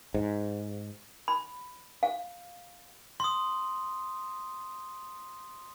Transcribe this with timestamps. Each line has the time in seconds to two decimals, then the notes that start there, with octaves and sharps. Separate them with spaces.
0.14 G#2
1.28 B5
2.03 F5
3.20 C6 D#6